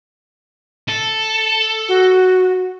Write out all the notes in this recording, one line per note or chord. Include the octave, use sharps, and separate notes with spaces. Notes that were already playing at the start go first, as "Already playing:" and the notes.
A4
F#4